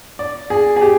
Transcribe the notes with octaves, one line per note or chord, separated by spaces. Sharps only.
D5
G#4
G#4
G4